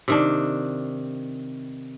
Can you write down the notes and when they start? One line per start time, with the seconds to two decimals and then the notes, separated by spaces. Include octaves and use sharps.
0.08 C3 D#3 D4